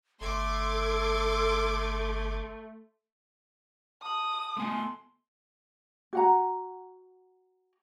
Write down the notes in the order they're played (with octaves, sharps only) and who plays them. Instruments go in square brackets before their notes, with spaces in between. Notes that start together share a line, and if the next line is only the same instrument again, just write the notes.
[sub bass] G1 [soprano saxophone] A3 [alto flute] A4 [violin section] C6 D6 G#6
[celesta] A5 F#7 [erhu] D#6
[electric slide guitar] A3 B3 G#5 [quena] C6
[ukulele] F#4 F#5 A#5